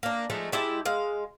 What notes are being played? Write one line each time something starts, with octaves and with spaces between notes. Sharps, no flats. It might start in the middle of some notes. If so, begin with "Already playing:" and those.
A#3 D4
F3 G#3 A3 D#4
G#3 E4 G4 A5
G#3 F5